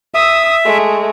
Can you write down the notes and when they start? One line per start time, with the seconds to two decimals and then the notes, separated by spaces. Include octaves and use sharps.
0.14 E5 D#6 E6
0.65 G#3 A3